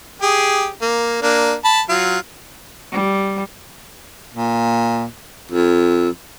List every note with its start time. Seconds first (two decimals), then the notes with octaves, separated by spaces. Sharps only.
0.22 G4 G#4
0.82 A#3
1.23 A#3 D4
1.64 A5 B5
1.89 F#3 F4
2.92 G3
4.35 A#2
5.51 F2